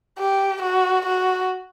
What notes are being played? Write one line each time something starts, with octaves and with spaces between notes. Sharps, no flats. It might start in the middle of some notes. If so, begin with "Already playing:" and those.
G4
F#4
F#4